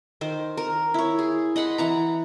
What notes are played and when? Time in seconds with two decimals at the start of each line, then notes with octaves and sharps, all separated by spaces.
0.21 D#3 C5
0.57 A#4
0.94 E4 C#5
1.19 G#4
1.56 D#5 F#5 B5 C6
1.78 E3 F#5 A#5